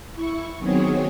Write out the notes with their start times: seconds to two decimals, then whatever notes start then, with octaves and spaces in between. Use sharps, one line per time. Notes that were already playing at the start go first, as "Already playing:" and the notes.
0.14 E4 C#6
0.58 D#3 F#3 B3 C4 G#4 C#5